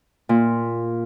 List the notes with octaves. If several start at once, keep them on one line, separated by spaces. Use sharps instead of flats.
A#2